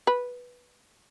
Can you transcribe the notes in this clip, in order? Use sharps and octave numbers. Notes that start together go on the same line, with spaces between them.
B4